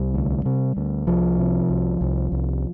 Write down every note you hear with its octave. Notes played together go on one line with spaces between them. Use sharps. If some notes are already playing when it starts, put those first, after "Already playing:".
Already playing: C2 G3
D2
C3
D2
C2 F3
C3
C2
C2
C2